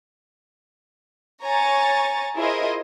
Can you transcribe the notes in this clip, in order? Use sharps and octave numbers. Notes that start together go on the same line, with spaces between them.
C#5 G#5 A#5 C#6 A6
E4 F4 G#4 A#4 C5 D#5